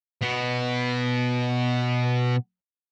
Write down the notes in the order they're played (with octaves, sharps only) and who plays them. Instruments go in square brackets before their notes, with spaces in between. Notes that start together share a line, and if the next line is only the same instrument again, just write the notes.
[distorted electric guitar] B2 B3